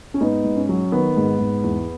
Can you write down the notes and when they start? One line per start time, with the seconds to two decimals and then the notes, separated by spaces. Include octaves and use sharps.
0.14 C#4
0.21 G#2 B3 D#4
0.44 G#2
0.56 C#4
0.69 F#3
0.92 D#3 B3
1.17 G#2
1.40 G#2
1.63 E2